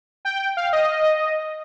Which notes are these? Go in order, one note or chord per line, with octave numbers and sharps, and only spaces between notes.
G5
F5
D#5